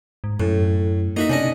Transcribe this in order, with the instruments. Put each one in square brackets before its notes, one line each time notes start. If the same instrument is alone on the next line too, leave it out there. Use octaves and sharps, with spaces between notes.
[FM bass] G#2
[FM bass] F#2 [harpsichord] A2
[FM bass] A#3 [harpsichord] D#4 F#4 E5
[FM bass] C3 [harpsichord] C#4 D4 D#5